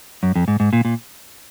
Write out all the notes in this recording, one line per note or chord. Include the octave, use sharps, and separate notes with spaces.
F#2
F2
G#2
G#2
A#2
A#2